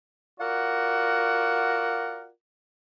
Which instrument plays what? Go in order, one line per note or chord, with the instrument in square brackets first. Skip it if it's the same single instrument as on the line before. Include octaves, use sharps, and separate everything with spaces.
[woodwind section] F4 F#4 A#4 D5 F#5